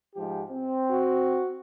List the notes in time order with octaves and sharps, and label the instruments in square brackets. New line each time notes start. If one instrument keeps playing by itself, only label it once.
[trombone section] G#2 F3 G4
C4
[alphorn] F#4